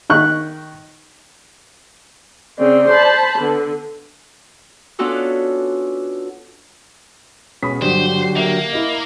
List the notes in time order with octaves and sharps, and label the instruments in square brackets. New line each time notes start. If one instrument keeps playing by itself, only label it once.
[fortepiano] D#3 C#6 F#6
[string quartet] C#3 C4 [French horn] D5
[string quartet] C5 A5 B5
[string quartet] D3 [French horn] B3
[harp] B3 C#4 D4 F4 F#4 A4
[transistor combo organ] B2 G#3 C#4 [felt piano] B5 D#6 B6
[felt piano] G2 [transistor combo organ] D3 F#3 G4 [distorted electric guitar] C5
[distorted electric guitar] A#3 [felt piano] A#4 E5
[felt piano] E4 D#5